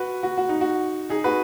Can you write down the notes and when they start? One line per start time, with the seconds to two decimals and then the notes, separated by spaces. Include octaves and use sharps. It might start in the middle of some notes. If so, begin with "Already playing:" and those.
Already playing: F#4 B4
0.23 F#4
0.37 F#4
0.49 D#4
0.61 F#4
1.09 D#4 G#4
1.24 F#4 B4